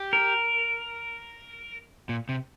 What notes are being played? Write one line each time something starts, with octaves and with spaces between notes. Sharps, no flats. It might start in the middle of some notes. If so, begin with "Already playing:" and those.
Already playing: G4
A#4
A#2
C3